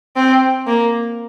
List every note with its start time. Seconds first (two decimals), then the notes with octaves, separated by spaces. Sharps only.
0.16 C4
0.67 A#3